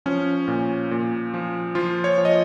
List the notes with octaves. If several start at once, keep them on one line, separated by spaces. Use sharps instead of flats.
F3 C#4
A#2
A#2
F3
F3 F4
C#5
F3
D#5